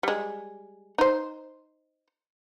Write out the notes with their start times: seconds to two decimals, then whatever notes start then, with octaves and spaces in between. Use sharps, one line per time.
0.03 G3 G#3
0.98 D#4 C5